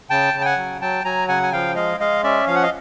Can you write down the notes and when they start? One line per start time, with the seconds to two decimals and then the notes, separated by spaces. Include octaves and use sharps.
0.10 C#3 G5 A5
0.34 C#3
0.41 G5
0.45 F#5 G#5
0.57 F#3
0.81 F#3 G5 A5
1.05 F#3 G#5 A#5
1.28 C#3 F#5 G#5
1.43 G#5
1.52 F3 F5 G5
1.76 G#3 D#5 F5
2.00 G#3 D#5 F5
2.23 C#4 D5 E5
2.47 F3 F5
2.55 F#5
2.63 D#5 F5